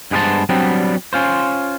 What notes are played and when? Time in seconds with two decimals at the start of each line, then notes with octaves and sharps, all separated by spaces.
0.11 G2 G#3 B3 G4 C5 A5
0.49 F#3 G3 B3 C4 D4
1.13 C#4 F4 C5